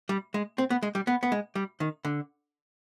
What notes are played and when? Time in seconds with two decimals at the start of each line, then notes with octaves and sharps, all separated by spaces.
0.09 G3
0.34 G#3
0.58 C4
0.70 B3
0.83 G#3
0.95 G3
1.07 B3
1.23 B3
1.32 G#3
1.55 G3
1.80 D#3
2.05 D3